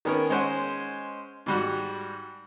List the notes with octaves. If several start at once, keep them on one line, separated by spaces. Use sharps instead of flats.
D#3 B3 C#4 A#4
G#3 C#4 C5 F#5
G#2 G3 F#4